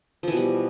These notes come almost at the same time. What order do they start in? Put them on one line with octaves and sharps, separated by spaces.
F3 E3 B2 G3